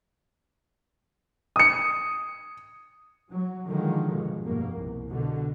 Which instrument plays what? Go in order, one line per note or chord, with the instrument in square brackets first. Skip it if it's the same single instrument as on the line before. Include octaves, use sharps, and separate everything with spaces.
[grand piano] D#6 C#7
[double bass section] F#3
D3 D#3 F3 F#3 G#3
G2 B2
F1 G2 B2 A#3
C2
B2 D3